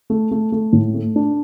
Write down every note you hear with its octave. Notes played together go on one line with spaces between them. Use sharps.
A3
A3
A3
A2
A3
D4